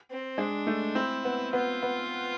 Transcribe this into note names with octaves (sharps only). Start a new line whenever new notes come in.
C4
G#3 D4
A3
C4 E4
B3
B3 F4
B3